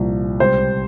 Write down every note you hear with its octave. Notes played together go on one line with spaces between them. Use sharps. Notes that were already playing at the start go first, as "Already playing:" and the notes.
Already playing: C2 A#2 F3
C#2 C3 G3 C5